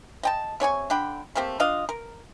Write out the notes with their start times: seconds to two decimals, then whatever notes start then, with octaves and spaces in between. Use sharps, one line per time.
0.23 D#5 G5 A5
0.60 C3 C#5 G#5 C#6
0.90 D3 D4 G5 B5
1.35 A3 A#3 C4 G4
1.60 D4 F4 D#5 F5
1.89 A#4